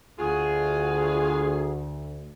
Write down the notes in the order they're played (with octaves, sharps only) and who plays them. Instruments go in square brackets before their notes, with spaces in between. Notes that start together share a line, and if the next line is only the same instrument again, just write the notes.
[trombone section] D2 [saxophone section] F4 F#4 G#4